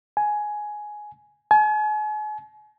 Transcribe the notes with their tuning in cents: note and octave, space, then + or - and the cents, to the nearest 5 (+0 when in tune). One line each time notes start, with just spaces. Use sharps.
G#5 +10
G#5 +40